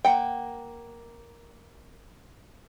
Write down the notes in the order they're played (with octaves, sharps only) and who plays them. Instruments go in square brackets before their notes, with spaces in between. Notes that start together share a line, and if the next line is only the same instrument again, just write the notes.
[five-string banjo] A#3 F#5 G5